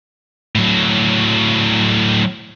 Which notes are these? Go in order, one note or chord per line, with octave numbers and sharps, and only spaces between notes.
A2 F#3